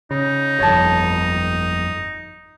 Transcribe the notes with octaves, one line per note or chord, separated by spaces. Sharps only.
C#3 D#4
G1 F2 C#5 A5